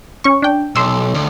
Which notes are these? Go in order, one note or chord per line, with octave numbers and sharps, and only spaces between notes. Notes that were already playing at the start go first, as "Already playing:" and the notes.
C#4 C#6
D4 G5
B1 C6 E6
D2